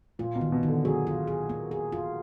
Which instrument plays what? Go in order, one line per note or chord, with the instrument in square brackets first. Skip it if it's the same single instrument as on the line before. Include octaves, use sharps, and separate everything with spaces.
[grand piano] A#2 [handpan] F4
[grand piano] B2
[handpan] D#3
[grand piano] B2
[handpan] D#3
[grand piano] D3
[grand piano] F#3 [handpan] G#4
[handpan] F4
G#4
A#3
G#4
F4